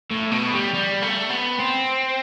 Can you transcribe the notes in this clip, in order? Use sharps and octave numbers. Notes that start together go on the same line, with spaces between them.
A2
B2
G3
G3
A3
B3
C4